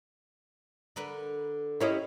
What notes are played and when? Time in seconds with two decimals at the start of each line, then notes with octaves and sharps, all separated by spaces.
0.96 D3 A#4 B4
1.80 C4 C#4 E4 G4 A#4 C#5 D#5